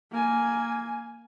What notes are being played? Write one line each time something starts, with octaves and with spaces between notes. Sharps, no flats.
A#3 G#5